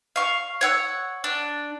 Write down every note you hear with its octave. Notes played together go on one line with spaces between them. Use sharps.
F5 C#6
C#5 F#5 E6
D4